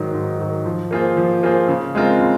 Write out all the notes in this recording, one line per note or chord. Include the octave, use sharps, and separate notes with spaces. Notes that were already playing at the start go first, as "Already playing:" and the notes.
Already playing: G#2 D#3 F#3
G#2
D#3 F#3
F3
A#3 F4 G#4 C5
F3
A#3 F4 G#4 C5
C#3
G#3 C4 F4 A#4
C#3